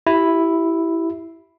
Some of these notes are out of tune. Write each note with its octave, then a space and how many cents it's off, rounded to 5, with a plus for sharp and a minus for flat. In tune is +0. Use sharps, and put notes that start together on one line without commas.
E4 +0 G4 -25